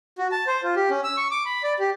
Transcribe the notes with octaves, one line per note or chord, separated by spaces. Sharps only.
F#4
A5
C5
F4
G4
C#4
E6
C#6
D6
B5
D5
G4